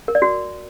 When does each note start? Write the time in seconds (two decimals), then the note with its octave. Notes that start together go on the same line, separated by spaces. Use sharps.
0.08 A#4
0.15 D5
0.22 F#4